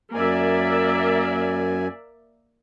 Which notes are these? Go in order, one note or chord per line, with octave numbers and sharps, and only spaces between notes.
F#2 A#3 D5 E5 G#5